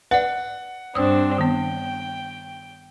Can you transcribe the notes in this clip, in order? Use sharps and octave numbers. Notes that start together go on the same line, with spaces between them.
B4 D5 F#5
G2 C4 D4 D#6 E6
D#3 B3 G5